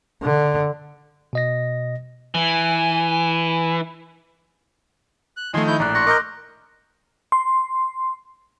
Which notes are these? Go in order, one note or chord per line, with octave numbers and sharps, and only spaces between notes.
D3
B2 D#5 A#6
E3 G#5
F#6
D#3 F3 A3 G#5 C6
E4 G6
A#1 A2 D5 A#5 F#6
C6 C#6 F#6 A#6
A#4 D#5 D6 G6
C6